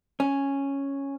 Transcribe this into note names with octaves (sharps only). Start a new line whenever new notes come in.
C#4